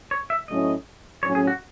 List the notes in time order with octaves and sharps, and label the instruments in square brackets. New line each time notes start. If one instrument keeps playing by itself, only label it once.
[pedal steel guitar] C#5
E5
[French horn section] A2 F#3 A3 C#4 E4 [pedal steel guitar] D#5
[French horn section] A2 F#3 C#4 [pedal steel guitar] C#5
[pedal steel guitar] G#4
F#4